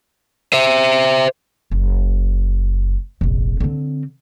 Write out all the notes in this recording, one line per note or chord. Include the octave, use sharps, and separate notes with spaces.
C5 E5
F#1
F1 A#1
D3 C4